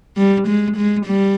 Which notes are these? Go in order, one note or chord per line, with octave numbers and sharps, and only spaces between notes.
G3
G#3
G#3
G3